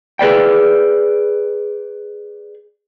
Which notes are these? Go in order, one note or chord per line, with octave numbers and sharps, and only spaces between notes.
G#4 B4 D5 G5